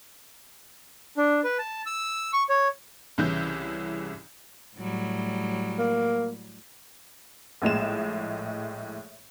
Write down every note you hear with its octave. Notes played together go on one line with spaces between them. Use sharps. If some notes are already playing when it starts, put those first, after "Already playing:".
D4
B4
A5
E6
C#6
C#5
C2 C#3 E3 E4 G6
A2 F#3 G3
A#3
A#1 A2 G#3 E7